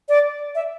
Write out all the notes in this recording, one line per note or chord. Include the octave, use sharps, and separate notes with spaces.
D5
E5